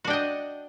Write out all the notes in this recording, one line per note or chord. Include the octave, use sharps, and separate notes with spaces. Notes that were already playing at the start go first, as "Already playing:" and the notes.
D4 F#4 D#5 G5